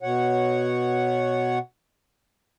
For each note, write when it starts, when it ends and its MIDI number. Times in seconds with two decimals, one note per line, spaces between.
0.03 1.59 47
0.03 1.59 73
0.03 1.59 78